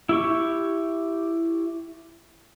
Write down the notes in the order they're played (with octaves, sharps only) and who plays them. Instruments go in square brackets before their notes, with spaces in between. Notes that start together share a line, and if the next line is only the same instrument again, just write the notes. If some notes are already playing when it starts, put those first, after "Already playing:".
[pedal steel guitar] E4 G4 C#6